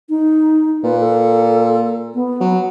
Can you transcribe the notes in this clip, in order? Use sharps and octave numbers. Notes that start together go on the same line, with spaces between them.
D#4
A#2 B4
A4
B3
F#3